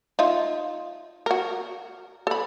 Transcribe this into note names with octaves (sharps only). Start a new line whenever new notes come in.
D#4 F4 E5
F#4 A#4
A4 B5